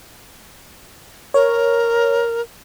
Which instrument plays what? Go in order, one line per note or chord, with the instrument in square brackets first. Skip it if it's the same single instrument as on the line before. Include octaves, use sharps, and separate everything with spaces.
[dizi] A#4 [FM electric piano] C#5